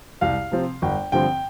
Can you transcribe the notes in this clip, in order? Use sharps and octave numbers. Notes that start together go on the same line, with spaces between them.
C2 F5
C3 F3 C4
G1 G5
G2 D3 F3 C4 G5